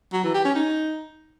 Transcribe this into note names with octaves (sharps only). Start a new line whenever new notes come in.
F#3
E3
G4
C#4
D#4